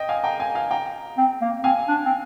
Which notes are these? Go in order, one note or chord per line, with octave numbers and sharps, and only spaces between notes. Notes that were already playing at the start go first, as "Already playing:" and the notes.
Already playing: D#5 G5
F5 G#5
G5 A#5
F5 G#5
F5 G#5
G5 A#5
C4
A#3
C4 F5 G#5
D4
C4